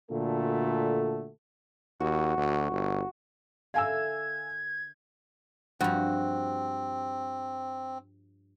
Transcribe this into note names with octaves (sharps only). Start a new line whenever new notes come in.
A#2 D3 A3 F#4 A4
D#2 F#4
D2
G1
D3 E4 A#4 F5 G#5 E6 G#6
G2 F3 C4 F#4